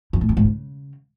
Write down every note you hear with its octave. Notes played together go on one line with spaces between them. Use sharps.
F2
A2
F2
G#2
C#3